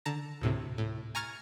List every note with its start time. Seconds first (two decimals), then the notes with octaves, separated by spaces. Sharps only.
0.05 D3 A5 A#5 A#6
0.41 D2 A2 C3
0.78 A2
1.15 G#5 A#5 C#6 F6 G#6 A6